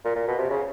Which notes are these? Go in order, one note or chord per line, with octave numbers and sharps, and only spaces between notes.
A#2
A#2
B2
C3
C#3